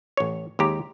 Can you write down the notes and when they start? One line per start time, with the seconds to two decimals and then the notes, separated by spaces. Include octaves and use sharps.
0.17 A1 C#5
0.59 D#2 G#3 G4 A#5